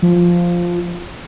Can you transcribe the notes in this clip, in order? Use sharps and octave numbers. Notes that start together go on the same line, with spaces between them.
F3